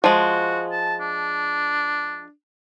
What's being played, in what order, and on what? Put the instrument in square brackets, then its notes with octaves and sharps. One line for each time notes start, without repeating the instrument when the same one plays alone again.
[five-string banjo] F3 G#3 [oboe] F#4
[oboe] A5
D4